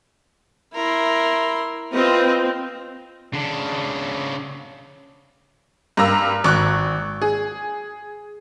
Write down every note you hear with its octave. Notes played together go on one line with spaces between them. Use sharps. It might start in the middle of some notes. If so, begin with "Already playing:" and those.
E4 A#4 C6
C4 F4 B4 D#5
C#3 D4
G2 A#3 A#5 E6
G#1 C#6 F#6
G#4